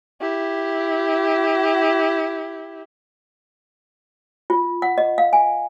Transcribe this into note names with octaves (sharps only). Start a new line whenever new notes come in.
E4 G4
F4
F#5
D#5
F5
G#5